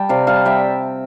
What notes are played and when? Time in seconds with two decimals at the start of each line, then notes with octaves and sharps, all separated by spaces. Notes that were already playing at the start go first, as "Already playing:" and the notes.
Already playing: G3 G5 A5
0.09 C3 D5 F5
0.27 G3 F5 A5
0.45 G3 E5 G5